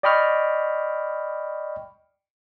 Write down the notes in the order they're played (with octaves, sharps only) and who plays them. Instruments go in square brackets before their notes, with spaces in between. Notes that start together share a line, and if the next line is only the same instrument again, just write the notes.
[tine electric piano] D5 D#5 G5 B5 C#6 F6